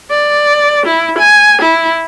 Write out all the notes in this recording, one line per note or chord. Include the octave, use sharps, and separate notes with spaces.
D5
E4
G#5
E4